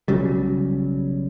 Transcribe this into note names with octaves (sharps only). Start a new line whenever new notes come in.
B1 C#3 F#3 G3